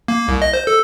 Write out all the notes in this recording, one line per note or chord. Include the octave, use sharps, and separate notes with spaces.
A#3
C2
D#5
C5
A4